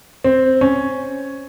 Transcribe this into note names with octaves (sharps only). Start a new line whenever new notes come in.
C4
C#4